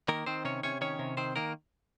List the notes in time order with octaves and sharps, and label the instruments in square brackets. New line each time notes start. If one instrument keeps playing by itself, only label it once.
[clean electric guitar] D#3 A#3 A#4
D#3 C4 C5
C3 C#4 C#5
C3 C#4 C#5
D#3 C#4 C#5
C3
D#3 C4 C5
D#3 A#3 A#4